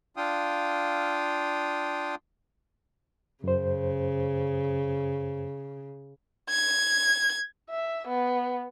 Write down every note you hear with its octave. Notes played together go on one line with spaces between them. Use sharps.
D4 F4 F5 G5 D#6
F#2 C#3 C5
G#6
E5
B3